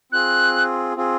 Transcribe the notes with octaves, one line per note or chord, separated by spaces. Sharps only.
C4 F4 G#4 F#6
C4 F4 G#4